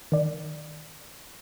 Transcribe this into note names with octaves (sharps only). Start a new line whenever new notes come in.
D#3 D5